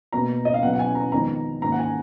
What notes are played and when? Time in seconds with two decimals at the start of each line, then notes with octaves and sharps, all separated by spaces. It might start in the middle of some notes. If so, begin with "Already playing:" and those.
0.12 B2 A#3 D4 A#5
0.45 D#5
0.54 F5
0.63 B2 F#3 D4 F#5
0.73 F#5
0.79 G#5
0.95 A#5
1.12 F2 D#3 G#3 B3 D4 A#5
1.61 G#2 D#3 A#3 D4 A#5
1.72 F#5
1.79 G#5